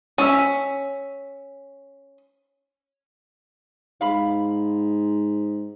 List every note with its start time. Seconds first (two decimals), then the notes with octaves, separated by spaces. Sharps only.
0.18 C#4 E5
4.01 G#2 F5 B5